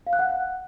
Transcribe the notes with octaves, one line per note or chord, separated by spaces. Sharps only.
F5
F#6
F#5